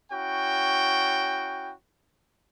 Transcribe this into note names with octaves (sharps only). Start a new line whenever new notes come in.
C#4 E4 F#4 G5